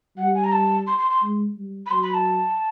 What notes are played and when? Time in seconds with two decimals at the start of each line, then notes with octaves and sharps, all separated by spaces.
0.18 G3 F#5
0.35 G#5
0.44 A#5
0.52 A5
0.87 C6
0.98 C6
1.10 C6
1.22 G#3
1.57 G3
1.86 B5
1.91 F#3 C6
2.03 B5
2.14 A5